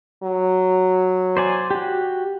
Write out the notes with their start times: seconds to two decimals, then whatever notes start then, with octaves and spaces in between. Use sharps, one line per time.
0.23 F#3
1.37 C5 D5 G#5
1.71 F#4 G4